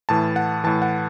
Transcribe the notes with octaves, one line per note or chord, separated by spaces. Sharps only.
A2 E3 A5
F#5
A2 E3 A5
F#5